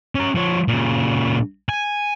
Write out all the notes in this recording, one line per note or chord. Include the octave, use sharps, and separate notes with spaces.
C#4 A#5
F3 C#5
A#2 C#3
G#5